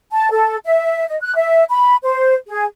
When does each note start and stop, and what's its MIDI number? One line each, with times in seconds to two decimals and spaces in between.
0.12 0.28 81
0.31 0.57 69
0.65 1.05 76
1.08 1.17 75
1.22 1.35 90
1.36 1.64 76
1.69 1.95 83
2.04 2.35 72
2.48 2.64 68